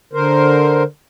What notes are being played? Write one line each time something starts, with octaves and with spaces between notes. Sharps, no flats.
D3 A#4 C5